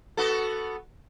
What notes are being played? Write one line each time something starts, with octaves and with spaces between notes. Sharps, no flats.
B3 F#4 A4